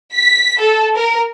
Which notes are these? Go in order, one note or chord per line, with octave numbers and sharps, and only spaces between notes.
B6
A4
A#4